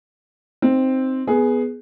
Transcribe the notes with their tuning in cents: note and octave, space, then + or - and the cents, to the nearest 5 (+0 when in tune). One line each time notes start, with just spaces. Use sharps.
C4 +0 D#4 +0
B3 +0 G#4 +10